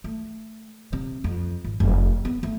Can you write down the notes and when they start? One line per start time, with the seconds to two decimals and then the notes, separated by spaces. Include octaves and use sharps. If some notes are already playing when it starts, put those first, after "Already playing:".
0.04 A3
0.93 C3
1.24 F2
1.64 G#1
1.80 F1
2.25 B3
2.43 A3